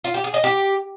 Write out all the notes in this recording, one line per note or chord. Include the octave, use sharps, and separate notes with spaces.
F4
G4
G#4
D#5
G4